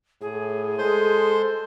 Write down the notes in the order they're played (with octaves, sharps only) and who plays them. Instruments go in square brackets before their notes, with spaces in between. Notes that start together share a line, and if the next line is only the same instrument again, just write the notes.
[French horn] A2 [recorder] G#4
[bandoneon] G#3 C5 C6 [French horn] A4